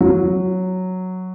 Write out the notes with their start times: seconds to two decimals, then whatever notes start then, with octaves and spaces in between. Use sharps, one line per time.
0.01 F#3